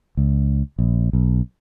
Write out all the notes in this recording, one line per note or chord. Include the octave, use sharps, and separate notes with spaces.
C#2
A#1
B1